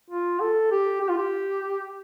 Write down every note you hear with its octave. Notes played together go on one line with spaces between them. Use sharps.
F4
A4
G4
G4
F4
G4